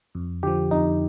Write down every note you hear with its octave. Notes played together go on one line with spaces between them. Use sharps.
F2
D3 F3 G4
F2 D#4